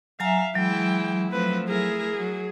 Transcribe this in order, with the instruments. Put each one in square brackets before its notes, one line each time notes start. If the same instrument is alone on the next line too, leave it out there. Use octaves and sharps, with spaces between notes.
[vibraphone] F#3 G#5 A#5 [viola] E5 F5
[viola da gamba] E3 G#3 E4 [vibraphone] F#3 [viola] G5
[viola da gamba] F3 A3 C4 [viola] B4
[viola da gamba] A3 E4 A#4 [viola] G#4
[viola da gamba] F#3